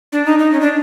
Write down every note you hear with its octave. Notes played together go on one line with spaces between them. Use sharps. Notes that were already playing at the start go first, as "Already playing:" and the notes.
D4
D#4
D#4
C#4
D4